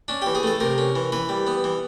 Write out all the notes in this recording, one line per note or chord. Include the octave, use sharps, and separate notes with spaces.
C#4 D4
E3 G4
G#4
A3 A4
C3 A#4
C#4
E3
E3 B4
G3
B3
E3